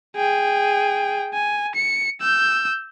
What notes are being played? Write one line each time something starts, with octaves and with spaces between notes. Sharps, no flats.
G#4 G5
G#5
C#7
E6 G6